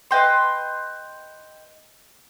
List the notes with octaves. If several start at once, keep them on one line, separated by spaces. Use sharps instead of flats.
B4 D#5 G5 C6